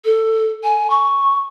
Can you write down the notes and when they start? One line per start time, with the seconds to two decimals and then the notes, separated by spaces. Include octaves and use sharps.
0.05 A4
0.64 G#5
0.90 C#6